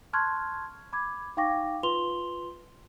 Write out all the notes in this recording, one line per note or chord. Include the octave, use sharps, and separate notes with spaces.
A5 C6 C#6 F6 F#6 G#6
B5 D6 G#6
D#4 F5 G5 C#6 D6 A#6
F4 B4 C6 F7 G7